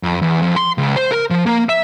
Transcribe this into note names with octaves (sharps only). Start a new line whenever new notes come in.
F2
E2
F2
C6
C#2
C5
A#4
F3
A#3
E5